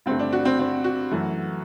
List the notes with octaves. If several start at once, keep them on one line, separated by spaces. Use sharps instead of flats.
G2 D3 A3 C4
D4
F#4
C4
C4
F#4
F#2 E3 A3